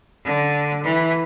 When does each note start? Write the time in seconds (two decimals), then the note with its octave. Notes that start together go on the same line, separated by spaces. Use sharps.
0.25 D3
0.83 E3